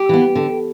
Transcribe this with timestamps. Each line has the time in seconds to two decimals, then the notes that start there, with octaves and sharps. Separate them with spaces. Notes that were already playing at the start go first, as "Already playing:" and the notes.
Already playing: G4
0.09 E3 B3
0.35 D3